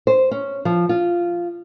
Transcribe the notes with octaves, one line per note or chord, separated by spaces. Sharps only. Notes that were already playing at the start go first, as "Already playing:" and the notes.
C5
C#4
F3
F4